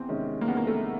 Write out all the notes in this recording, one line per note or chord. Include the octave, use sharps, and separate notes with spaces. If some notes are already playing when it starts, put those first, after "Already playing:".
Already playing: E2 C4
C3 D#3 G#3 C#4
A#3
E2 B3
A#3
A3